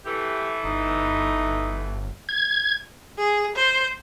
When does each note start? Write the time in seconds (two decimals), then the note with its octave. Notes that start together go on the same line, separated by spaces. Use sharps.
0.05 E3 A3 G4
0.64 G1 D#4
2.29 G#6
3.18 G#4
3.56 C5